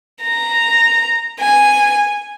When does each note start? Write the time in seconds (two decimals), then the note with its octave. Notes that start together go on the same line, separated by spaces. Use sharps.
0.24 A#5
1.40 G#5